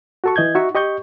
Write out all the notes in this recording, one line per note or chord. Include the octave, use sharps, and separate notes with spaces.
F#4 A4 C#6
E3 D#5 G6 G#6
D#4 F#4 E5 C#6
G4 D#5 C#6 G6